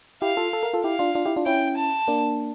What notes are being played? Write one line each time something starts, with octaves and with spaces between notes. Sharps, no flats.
E4 G4 F5
F4 A4
A4
A#4
F4 A4
E4 G4 F5
D4 F4
D4 F4
E4 G4
D4 F4
C#4 E4 G5
A5
A#3 D4